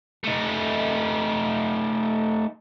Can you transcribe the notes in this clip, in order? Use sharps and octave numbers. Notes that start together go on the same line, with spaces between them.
A3 D#4